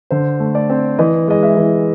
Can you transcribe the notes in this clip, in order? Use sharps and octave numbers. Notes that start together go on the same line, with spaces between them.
D3 C5
A3
D5
C4
E3 D#5
G#3 D#5
E5
E3